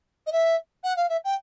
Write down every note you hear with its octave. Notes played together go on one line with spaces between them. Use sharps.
D#5
E5
F#5
F5
E5
G5